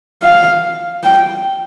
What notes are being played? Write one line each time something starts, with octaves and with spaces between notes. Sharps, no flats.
F5
G5